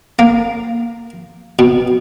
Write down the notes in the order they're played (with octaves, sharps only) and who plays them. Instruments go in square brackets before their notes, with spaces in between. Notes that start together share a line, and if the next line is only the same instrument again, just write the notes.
[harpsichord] A#3
B2